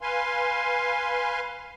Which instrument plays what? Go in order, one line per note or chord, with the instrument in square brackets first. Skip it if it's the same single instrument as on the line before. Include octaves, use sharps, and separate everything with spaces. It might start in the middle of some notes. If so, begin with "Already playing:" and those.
[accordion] B4 F5 G#5 C6